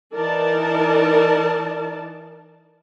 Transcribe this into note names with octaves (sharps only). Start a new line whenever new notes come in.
E3 D#4 A#4 D5 A5